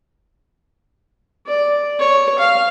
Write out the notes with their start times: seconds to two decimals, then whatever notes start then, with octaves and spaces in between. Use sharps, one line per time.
1.47 D5
2.00 C#5
2.39 F5